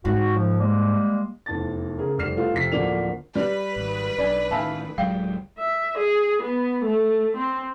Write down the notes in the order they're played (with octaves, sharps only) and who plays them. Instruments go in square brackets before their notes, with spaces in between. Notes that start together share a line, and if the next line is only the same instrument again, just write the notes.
[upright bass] G#2 [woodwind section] F#4
[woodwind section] F3
G3 G#3 A#3
[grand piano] F1 E2 A5 A6
C#3 G#4 A#4
F1 G3 F6 C7 E7
A3 B3 F4
F2 C3 B6 C7
D1 D3 F3 A#3 D4 F7
[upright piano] G3 [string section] B4
[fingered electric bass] G#1
[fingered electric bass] B1 [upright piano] D4 G#5
[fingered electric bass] A1 D#3 [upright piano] E5 F5 B5 [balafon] G#5 A5
[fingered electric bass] D1 F#3 G#3 [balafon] F5 [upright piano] G5
[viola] E5
G#4
B3
A3
C4